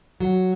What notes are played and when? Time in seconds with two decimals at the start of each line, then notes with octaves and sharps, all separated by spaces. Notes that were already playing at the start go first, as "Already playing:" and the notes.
0.20 F#3